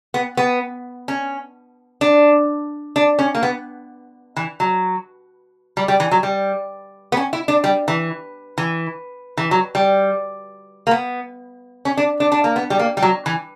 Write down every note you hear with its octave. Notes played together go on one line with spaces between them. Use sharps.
B3
B3
C#4
D4
D4
C#4
A#3
B3
E3
F#3
G3
G3
E3
F#3
G3
B3
C#4
E4
D4
G3
E3
E3
E3
F#3
G3
A#3
B3
C#4
D4
D4
D4
A#3
B3
G3
A#3
G3
F#3
E3